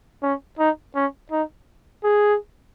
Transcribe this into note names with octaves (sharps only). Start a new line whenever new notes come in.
C#4
D#4
C#4
D#4
G#4